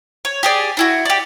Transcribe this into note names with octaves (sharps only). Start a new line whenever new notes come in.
C#5
G4 G#4 D5
D4 E4 F#4
G4 D5